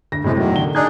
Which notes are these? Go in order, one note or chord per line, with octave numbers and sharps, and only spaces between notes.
D2 A#6
A2 C3 G#3 A3
E2 D#3 F#3
D3 G7
D4 D#4 G#4 D5 F#6 G#6